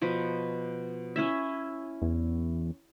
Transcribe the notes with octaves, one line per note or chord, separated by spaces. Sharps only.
B2 F3 B4
C#4 E4 E5
E2